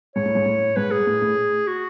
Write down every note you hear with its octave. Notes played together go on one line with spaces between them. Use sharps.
G#2 C#5
A2
G#2
A2
G#2 B4
G#4
A2
A2
F#4